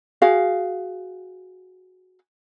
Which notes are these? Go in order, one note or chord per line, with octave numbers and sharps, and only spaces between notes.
F#4 G#4 F5